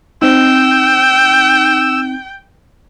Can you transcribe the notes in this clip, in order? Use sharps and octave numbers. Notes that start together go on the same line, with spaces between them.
C4 D#4 G5 E6